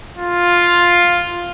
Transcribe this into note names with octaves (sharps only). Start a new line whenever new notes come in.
F4